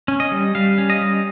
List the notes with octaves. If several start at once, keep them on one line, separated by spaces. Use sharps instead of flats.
C#4
D#5
G3
G3 F5
C#4
D#5
G3